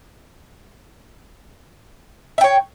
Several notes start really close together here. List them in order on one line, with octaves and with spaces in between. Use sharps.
E5 G5 C#5